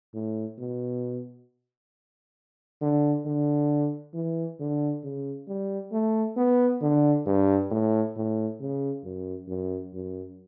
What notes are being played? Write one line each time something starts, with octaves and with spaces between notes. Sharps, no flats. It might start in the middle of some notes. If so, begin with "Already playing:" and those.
A2
B2
D3
D3
E3
D3
C#3
G3
A3
B3
D3
G2
A2
A2
C#3
F#2
F#2
F#2